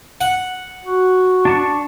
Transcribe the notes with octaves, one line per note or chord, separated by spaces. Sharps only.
F#5
F#4
D4 A5 C#6